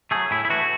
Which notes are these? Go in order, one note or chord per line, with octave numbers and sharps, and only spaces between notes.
F#3 A3 G#4
A2 E4
E4
E3 A3 F#4